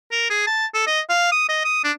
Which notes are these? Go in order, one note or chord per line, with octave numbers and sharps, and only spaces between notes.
A#4
G#4
A5
A4
D#5
F5
D#6
D#5
D#6
D4